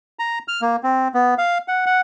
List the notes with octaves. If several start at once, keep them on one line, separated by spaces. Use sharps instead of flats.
A#5
F6
A#3
C4
B3
F5
F#5
F#5